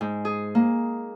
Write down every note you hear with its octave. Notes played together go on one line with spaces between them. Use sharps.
G#2
G#4
A#3